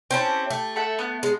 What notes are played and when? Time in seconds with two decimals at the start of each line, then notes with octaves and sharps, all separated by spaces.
0.11 C4 C#4 E4 G4 A5
0.50 A3
0.76 A4 E5 F#5
0.99 B3 F#6
1.23 G#3